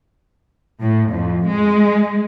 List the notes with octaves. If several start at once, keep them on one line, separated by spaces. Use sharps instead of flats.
A2
F2
G#3